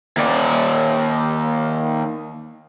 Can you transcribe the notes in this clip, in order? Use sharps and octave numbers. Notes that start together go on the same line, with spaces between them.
D#2 D5